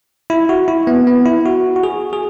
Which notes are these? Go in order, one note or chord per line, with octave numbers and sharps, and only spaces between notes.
E4
F#4
E4
B3
B3
E4
F#4
F#4
G#4
G#4